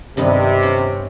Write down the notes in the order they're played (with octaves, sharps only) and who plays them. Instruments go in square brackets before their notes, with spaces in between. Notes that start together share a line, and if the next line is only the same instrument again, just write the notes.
[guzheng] G2 D#3 B3 [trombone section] C3
[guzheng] C#4